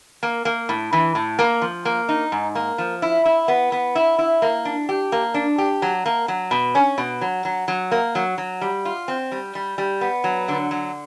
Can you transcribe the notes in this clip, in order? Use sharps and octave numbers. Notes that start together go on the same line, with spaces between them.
A#3
A#3
A2
E3
A2
A#3
F3
A#3
D#4
G#2
A#3
F3
E4
E4
B3
B3
E4
E4
A#3
D4
G4
A#3
D4
G4
F#3
A#3
F#3
B2
C#4
B2
F#3
F#3
F#3
A#3
F#3
F#3
G3
F4
C4
G3
G3
G3
B3
F#3
D3
F#3